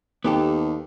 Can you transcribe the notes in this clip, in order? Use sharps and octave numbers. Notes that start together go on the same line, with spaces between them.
D#2 B3 G4 A4